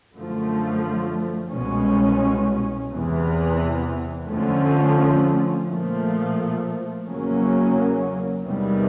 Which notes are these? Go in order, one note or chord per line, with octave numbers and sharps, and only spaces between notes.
F#2 D3 F3 A3
C2 B2 G#3 C#4
E2 C3 E3
F2 D3 F3 A3 C#4
A#2 F3 A3
E2 C#3 F#3 A#3 C#4
E2 C3 D#3 G3 B3